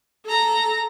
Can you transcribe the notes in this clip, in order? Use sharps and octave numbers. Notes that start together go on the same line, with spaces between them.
A4 A#5